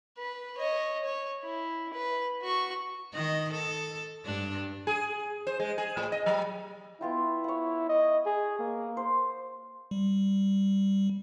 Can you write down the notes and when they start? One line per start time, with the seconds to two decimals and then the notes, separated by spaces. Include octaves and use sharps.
0.18 B4
0.58 C#5 D#5
1.04 C#5
1.44 E4
1.94 B4
2.42 F#4 C#6
3.13 D#3 D#5
3.53 A4
4.25 G2 D4
4.87 G#4
5.47 C5
5.60 G#3
5.78 G#4
5.97 A2
6.12 D#5
6.26 F#3
7.01 B3 E4 F4 G5
7.44 C#5 F#5
7.89 D#5
8.26 G#4
8.59 A#3
8.97 C5
9.91 G3